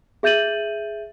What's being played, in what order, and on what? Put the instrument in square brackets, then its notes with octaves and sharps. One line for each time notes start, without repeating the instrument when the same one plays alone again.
[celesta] G#4 E5 G6 A6 D#7 F#7